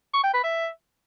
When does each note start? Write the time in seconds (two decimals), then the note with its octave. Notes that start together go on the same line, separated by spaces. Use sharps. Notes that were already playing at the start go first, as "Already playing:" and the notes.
0.14 C#6
0.24 G5
0.34 B4
0.44 E5